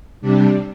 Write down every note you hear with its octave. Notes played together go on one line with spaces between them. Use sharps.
C3 G3 D4